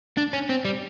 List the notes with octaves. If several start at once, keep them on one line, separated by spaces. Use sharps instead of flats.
D4
C#4
C4
G3